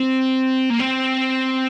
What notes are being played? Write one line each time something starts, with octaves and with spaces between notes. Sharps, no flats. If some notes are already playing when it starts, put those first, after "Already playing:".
Already playing: C4
A#3
C4